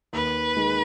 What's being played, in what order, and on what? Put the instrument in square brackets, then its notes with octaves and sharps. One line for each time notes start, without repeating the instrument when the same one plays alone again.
[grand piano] D#2 [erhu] B4
[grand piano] D#3 G#3